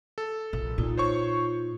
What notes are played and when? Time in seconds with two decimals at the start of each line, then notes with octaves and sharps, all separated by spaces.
0.18 A4
0.53 A#1
0.78 A#2 D#4 F4
0.98 C5 C#5 C#6